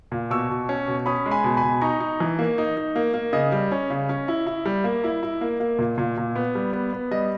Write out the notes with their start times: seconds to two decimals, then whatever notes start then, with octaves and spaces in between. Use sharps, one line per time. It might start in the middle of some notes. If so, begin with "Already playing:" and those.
0.12 A#2
0.30 B2 C#6 E6
0.49 B2
0.69 C#4
0.88 B2
1.06 C#4 B5 D#6
1.26 G#3
1.31 G#5 B5
1.44 B2
1.57 G#5 B5
1.63 B2
1.81 D#4 A#5 C#6
2.00 D#4
2.20 E3
2.39 A#3
2.58 D#4
2.77 D#4
2.96 A#3
3.14 A#3
3.33 C#3 D#5
3.52 G3
3.72 C#4
3.90 C#3
4.09 C#4
4.28 E4
4.47 E4
4.65 G3
4.84 A#3
5.04 E4
5.23 E4
5.41 A#3
5.60 A#3
5.79 A#2
5.98 A#2
6.17 A#2
6.36 B3
6.55 G3
6.73 B3
6.93 B3
7.11 G3 D#5